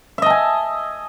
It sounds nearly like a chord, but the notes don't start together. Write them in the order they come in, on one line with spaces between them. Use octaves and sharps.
E5 D#5 A5 G#5